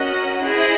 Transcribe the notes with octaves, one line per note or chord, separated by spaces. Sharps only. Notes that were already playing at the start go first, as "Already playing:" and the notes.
Already playing: C#4 F#4 A#4 D#5 F#5
E4 G#4 C5 D#5